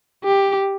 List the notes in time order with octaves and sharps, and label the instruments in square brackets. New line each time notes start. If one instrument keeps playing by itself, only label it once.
[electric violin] G4